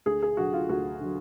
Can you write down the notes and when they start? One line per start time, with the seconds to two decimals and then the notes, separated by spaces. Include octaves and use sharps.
0.06 D2 G#4
0.22 G#4
0.37 D3 F#3 F#4
0.53 F4
0.69 D2 F#4
1.00 D3 F#3